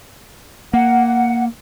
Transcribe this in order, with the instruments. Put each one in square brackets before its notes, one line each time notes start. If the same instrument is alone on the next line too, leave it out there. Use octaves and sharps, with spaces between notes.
[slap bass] A#3 [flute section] F#5